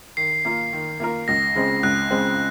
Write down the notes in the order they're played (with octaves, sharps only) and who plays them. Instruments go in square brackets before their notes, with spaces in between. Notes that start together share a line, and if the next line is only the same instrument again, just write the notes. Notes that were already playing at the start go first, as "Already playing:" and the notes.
[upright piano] D#3 [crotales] C7
[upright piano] A#3 F4 A#4
D#3
A#3 F4 A#4
[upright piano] C#2 [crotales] A#6
[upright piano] C#3 G#3 C4
[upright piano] C#2 [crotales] F#6
[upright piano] C#3 G#3 C4